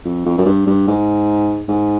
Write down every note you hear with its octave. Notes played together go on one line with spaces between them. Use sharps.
F2
F2
F#2
G2
G2
G#2
G#2